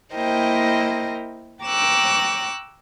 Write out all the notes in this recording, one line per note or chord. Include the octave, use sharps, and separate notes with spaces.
A#3 E4 A#4 C5 D#5 G5
G5 A#5 C#6 D6 E6 F#6